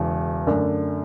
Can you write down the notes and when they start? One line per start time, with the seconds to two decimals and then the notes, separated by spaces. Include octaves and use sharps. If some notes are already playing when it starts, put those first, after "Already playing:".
Already playing: E1 E2 C#3
0.47 F#2 D3 A3 D4